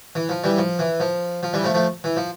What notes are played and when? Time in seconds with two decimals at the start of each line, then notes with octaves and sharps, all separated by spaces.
0.15 E3
0.29 F3
0.44 E3 G3
0.58 F3
0.79 E3
1.00 F3
1.43 F3
1.53 E3 G3
1.64 F3 A3
1.74 F3 A3
2.04 E3
2.17 F3